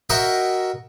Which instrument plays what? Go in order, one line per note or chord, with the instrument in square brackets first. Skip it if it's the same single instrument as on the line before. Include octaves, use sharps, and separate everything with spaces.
[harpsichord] F#4 A#4 D#5 E5 F#5 G5